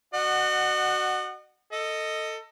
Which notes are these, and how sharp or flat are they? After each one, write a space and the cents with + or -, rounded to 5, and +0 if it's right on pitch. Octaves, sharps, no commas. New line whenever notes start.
F#4 +10 D#5 -40 F#5 +0
A4 +20 D#5 +0